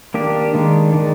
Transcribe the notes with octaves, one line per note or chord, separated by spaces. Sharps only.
D#3 A#3 D4 G4
D#3 G#3 D4
D#3 G#3 D4